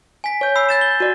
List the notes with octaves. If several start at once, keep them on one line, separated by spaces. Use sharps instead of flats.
G#5 B6
C#5 G6
B5 E6 C7
G6 A6 E7
G7
F#4 D5